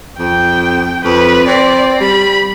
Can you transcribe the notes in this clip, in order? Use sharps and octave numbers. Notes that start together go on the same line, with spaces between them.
F2 G5
F2 B4
C4 D5
G3 B5